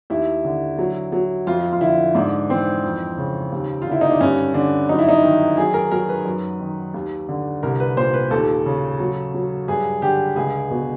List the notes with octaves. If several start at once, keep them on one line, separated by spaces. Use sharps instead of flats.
D#2 E4
D3
F#3
F#3
F2 F4
F4
D3 E4
G#2 D4
E3 C4
F2
C#3
D#2
D3 F4
E4
D#4
D4
G2 C#4
D3 D4
F#2 D#4
E4
D#4
D#3
F#3 G#4
A#4
F#3 A#4
B4
F#2
D#3
D#2
D3
C2 A#4
B4
A#2 C5
B4
D#2 A4
C#3
F#3
F#3
G2 G#4
D3 G4
C#2 G#4
B2